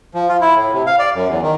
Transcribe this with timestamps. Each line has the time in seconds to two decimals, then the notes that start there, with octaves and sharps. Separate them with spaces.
0.14 F3
0.29 F4
0.41 E4
0.56 A2
0.73 C3
0.87 F5
0.99 D5
1.14 F#2
1.28 E2
1.42 D#3